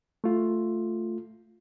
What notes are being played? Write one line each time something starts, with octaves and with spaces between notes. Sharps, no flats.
A3 F4